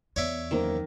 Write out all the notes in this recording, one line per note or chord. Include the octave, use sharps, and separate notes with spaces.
E2 C#5 D5 E5
F#1 D#3 A#3 C5